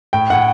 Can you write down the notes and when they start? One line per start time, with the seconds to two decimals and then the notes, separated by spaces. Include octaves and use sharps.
0.13 A2 G5
0.30 A2 F#5